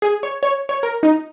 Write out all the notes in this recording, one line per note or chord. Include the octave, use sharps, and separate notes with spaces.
G#4
C#5
C#5
C#5
A#4
D#4